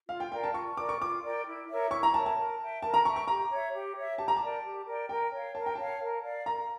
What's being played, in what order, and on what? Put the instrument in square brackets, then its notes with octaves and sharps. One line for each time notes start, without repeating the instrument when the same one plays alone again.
[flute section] F4 [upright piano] F5
[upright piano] G5
[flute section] A#4 D5 F5 [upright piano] G5
[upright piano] A5
[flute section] F4 [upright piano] C#6
[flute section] A#4 D5 G5 [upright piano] D6
[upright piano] C#6
[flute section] F4 [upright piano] D6
[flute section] A#4 D5 G5
E4
A#4 C#5 E5
[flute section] E4 [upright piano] C#6
[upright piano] A#5
[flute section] A#4 C#5 E5 [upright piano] A5
[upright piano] A5
[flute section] A#4
E5 G5
[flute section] A#4 [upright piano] A5
[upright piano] A#5
[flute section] E5 G5 [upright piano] C#6
[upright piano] C#6
[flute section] G4 [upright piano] A#5
[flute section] C#5 E5
G4
C#5 E5
[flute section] G4 [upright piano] A5
[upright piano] A#5
A5
[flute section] A#4 D5 G5
G4
A#4 D5 G5
[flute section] A#4 [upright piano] G5
[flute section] C#5 F5
[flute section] A#4 [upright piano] A5
[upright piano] G5
[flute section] C#5 F5 [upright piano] A5
[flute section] A#4
D5 F5
[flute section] A#4 [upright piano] A#5